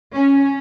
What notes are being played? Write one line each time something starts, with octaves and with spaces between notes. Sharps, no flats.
C#4